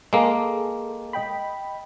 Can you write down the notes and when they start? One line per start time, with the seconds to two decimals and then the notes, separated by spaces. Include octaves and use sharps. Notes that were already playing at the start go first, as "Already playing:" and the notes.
0.13 G#3 A#3 G#4 A4
1.13 D#5 G5 B5